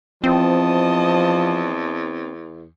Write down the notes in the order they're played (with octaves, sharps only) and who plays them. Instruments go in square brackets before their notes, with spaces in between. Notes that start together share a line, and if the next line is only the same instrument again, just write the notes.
[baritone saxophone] E2 [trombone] F3 [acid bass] C4 [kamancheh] D#5 A5